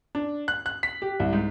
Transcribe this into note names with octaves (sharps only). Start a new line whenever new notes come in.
D4
F#6
F#6
B6
G4
C2
G#2